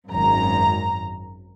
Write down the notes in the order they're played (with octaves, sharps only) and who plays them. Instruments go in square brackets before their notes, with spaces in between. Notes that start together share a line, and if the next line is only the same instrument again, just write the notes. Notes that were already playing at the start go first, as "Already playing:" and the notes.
[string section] G#1 F#2 A#5